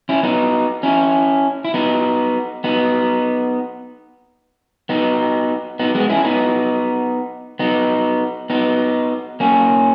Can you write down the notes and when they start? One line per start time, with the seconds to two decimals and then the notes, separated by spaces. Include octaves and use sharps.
0.09 C#4 E4
0.23 B3 D#4
0.83 C#4 E4
1.65 E4
1.74 B3 D#4
2.64 B3 D#4
4.89 B3 D#4
5.79 B3 D#4
5.95 G#3 B3
6.10 C#4 E4
6.24 B3 D#4
7.59 B3 D#4
8.50 B3 D#4
9.40 A#3 C#4